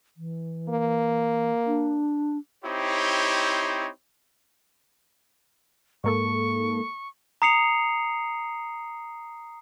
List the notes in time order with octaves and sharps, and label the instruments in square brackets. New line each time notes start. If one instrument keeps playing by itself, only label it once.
[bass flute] E3
[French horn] A#3
[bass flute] D4
[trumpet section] C4 D#4 E4 G4 C5 C#5
[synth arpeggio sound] G#2 A#3 A4 [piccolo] C#6
[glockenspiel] A#5 D#6 C7 C#7 F7